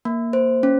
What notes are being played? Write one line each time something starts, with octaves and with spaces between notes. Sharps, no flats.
A#3
C5
C#4